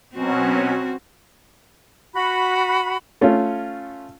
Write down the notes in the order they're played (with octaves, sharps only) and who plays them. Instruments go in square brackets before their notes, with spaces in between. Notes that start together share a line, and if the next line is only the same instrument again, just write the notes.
[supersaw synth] B2 F#3 C#4 [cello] C4 F#4
[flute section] F#4 B5
[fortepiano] A3 C#4 F4